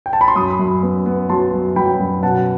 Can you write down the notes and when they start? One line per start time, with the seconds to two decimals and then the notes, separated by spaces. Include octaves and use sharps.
0.06 G5
0.13 A5
0.21 B5
0.28 C6
0.36 F#2 B5 D#6
0.59 F#2
0.83 B3
1.06 B3
1.29 F#3 A5 C6
1.53 F#2
1.76 F#3 G5 B5
1.99 F#2
2.23 B2 F#5 A5